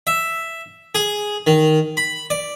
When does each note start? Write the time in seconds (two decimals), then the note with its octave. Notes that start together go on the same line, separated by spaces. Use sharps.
0.07 E5
0.95 G#4
1.47 D#3
1.97 B5
2.30 D5